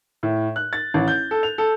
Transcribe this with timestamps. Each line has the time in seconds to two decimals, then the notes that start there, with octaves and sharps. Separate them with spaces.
0.23 A2
0.56 F#6
0.73 A6
0.94 A1
1.08 G6
1.31 A4
1.43 F7
1.58 A4